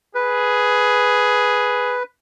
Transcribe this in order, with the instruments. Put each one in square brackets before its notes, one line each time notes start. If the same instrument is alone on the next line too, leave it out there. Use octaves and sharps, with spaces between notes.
[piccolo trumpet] G#4 [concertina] B4